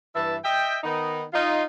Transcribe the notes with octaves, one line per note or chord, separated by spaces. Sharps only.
G2 E3 E4 E5 A5
D#5 E5 G5
D#3 B3 D#4
D#4 F4